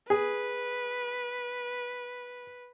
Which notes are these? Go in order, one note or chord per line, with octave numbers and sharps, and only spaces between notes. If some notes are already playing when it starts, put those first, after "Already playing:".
G#4 B4